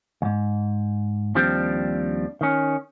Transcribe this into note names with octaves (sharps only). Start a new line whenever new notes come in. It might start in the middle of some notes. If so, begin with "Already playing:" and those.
D#2 G#2
D#2 F3 G3 C4 D4
D#3 C#4